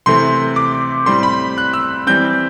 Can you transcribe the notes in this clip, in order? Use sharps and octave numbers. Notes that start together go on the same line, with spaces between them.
C3 E3 A3 C4 C6
D6
A2 G3 C4 C6
B5
F#6
E6
E3 G3 C4 G6